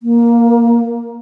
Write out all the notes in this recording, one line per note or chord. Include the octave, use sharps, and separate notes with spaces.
A#3